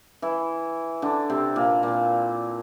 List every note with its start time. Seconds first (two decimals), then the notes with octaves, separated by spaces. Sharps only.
0.22 E3 E4
1.02 D3 D4
1.30 C3 C4
1.56 A#2 A#3
1.83 A#2 A#3